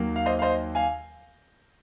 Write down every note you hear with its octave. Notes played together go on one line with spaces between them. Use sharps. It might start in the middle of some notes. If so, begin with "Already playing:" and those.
Already playing: D#2 D#3 F#3 A#3
F5
C5 D#5
F5
C5 D#5
F5 G#5